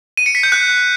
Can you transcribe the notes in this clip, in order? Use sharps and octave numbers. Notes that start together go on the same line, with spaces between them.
D#7
C#7
B6
G6
F#6